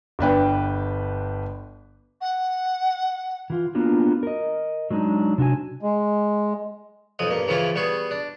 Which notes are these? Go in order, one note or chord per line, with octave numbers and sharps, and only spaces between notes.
G1 D4 B4 G5
F#5
E3 F4
A#3 B3 D4 F4 F#4
A#4 D#5
F#3 G#3 D4 D#4
C3 D4 F#4 G#5
G#3
B1 F2 F3 D#6
G2 A#3
C#3 E3 F3 C#4 E4 F4
G3 B3 F#4 G#4
D4